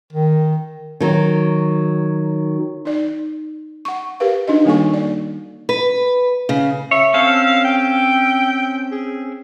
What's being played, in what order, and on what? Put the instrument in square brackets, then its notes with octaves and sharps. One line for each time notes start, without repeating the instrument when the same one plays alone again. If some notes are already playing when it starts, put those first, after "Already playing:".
[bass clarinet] D#3
[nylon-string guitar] D#3 F#3
[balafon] D#4 D5
F#5 C#6
G4 A#4 B4 F5
D4 D#4 F#4 D#5
D#3 G3 A#3 A4 G#5 C#6
D5
[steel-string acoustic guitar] B4
C#3
[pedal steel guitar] C#5 [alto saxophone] E5
[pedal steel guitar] C4 C#4 A4 [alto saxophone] F5
[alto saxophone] G5
G#4